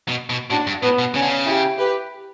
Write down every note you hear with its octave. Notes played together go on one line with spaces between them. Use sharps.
B2
B2
A2 D4 F#4
G2
A2 B3
B2
C#3 C#4
D3
C#3
E4 G4
G4 B4